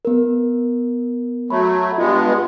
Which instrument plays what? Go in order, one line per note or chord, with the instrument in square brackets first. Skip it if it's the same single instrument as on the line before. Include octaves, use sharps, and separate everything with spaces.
[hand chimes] B3 A#4
[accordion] F#3 A3 [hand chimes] B5
[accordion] G2 G#3 B3 [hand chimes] F4